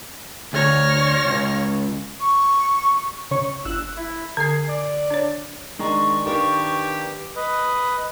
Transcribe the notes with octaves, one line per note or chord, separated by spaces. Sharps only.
D2 C#5 F6 A#6
C#2
C#6
C#3 C#5 C#6
G1 E6 F#6
E4
D3 G#4 G#6 C7
D5
D4 C#5
D#3 G#3 D4 A#5 C#6
D#3 A#3 D4 G4 B4
B4 D#5